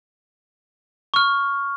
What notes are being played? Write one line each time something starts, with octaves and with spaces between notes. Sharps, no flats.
C#6 F6